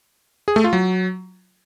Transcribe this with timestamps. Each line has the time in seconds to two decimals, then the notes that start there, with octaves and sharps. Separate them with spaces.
0.48 G#4
0.56 A3
0.64 F4
0.73 F#3